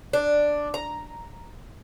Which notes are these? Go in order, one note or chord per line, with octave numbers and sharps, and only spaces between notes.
D4
A#5